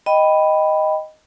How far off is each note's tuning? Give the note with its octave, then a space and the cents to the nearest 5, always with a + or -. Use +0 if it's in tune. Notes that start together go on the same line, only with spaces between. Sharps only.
D#5 +0 G5 +0 B5 +0